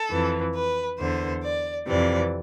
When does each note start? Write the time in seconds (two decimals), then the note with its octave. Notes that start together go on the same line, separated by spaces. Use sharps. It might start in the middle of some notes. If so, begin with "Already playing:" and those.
Already playing: A4
0.10 F2 E3
0.54 B4
0.98 E2 D3 C5
1.43 D5
1.87 F2 C3 E3 D5